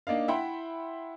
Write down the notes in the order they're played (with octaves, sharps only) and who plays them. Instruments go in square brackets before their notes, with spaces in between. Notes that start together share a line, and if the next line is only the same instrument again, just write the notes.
[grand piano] A#3 D4 D#4 F5
E4 E5 F#5 G5 B5 C6